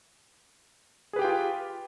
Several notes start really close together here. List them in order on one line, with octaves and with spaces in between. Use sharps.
G#4 B4 G4 G5 F4